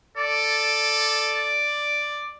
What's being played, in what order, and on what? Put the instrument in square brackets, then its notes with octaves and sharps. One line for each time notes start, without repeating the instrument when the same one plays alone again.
[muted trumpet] A4 [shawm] D5